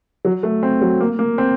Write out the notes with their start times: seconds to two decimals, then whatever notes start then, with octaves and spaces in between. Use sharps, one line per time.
0.25 F#3
0.43 A3
0.63 C4
0.81 F#3
1.00 A#3
1.19 A#3
1.38 C4